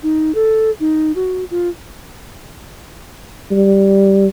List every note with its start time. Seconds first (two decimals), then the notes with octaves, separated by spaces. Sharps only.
0.03 D#4
0.35 A4
0.80 D#4
1.16 F#4
1.51 F4
3.51 G3